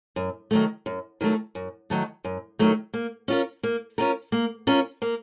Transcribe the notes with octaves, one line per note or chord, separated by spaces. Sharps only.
F#2
D#3 F#3 A3
F#2
D#3 F#3 A3
F#2
D#3 F#3 A3
F#2
D#3 F#3 A3
A#3
C#4 F4 A#4
A#3
C#4 F4 A#4
A#3
C#4 F4 A#4
A#3